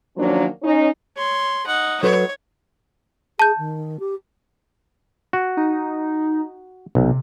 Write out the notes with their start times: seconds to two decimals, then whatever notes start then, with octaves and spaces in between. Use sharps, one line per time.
0.17 D#3 F3 F#3 A#3 C#4 D4
0.63 C#4 D#4
1.17 C#5 C6
1.66 D#4 F#5
2.03 F#3 A4 B4 C#5
3.39 G#4 A5 G6
3.58 D#3
4.00 G4
5.33 F#4
5.57 D#4
6.95 B1 C3